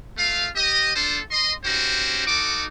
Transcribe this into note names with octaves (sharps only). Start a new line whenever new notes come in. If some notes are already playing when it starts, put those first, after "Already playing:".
A3 F4 F5
G4 D#5
D4 F4 A4 C5
D#5 C6
C#4 D#4 F#4 G4 C5
D#4 F#4 A4 D6